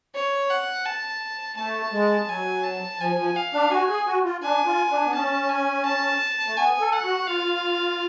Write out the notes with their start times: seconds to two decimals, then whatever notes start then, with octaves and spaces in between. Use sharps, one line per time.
0.15 C#5
0.50 F#5
0.86 A5
1.56 A3 A5
1.92 G#3
2.28 F#3 G#5
2.64 A5
2.99 F3 G#5
3.18 F3
3.36 F5
3.53 D4
3.70 F#4 G#5
3.89 G#4
4.07 F#4
4.25 F4
4.42 D4 G#5
4.66 F4
4.90 D4
5.06 B3
5.14 C#4 A5
5.49 G#5
5.85 A5
6.47 A3
6.56 B3 G#5
6.80 A4
6.92 F#5
7.04 F#4
7.27 F4 F5